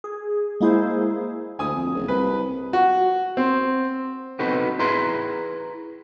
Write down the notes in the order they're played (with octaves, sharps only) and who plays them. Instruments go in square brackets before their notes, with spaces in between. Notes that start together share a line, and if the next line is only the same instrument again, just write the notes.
[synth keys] G#4
G#3 A#3 E4 G#4 C5
[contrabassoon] D2 [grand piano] G#5 D#6
[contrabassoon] F2
F#1
[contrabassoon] C2 [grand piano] B4
[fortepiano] F#4
C4
[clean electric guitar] B3 C4 D#4 F#4 A4 B4
E4 G#4 B4 A#5 C6